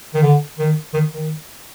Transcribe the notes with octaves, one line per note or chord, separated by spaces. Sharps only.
D#3
D3
D#3
D#3
D#3